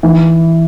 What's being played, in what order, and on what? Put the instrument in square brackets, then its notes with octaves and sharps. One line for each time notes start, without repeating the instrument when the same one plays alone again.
[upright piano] E3